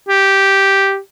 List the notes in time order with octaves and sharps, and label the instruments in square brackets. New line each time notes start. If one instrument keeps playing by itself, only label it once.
[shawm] G4